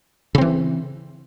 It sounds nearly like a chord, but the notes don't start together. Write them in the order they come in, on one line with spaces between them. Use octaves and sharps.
C#3 C4 E3